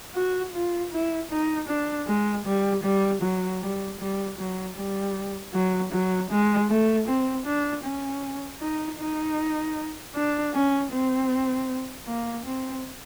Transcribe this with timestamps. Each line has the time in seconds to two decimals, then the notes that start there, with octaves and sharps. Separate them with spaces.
0.15 F#4
0.54 F4
0.92 E4
1.31 D#4
1.68 D4
2.08 G#3
2.46 G3
2.84 G3
3.22 F#3
3.61 G3
4.00 G3
4.38 F#3
4.77 G3
5.54 F#3
5.93 F#3
6.30 G#3
6.69 A3
7.08 C4
7.46 D4
7.84 C#4
8.62 D#4
8.99 D#4
10.15 D4
10.54 C#4
10.92 C4
12.07 A#3
12.46 C4